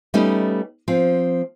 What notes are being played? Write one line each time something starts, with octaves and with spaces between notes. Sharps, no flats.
G3 A3 B3 C#4 D#4 D#5
F3 C4